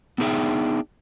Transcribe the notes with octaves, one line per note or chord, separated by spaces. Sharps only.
B3 D4 D#4 G#4 E5 G5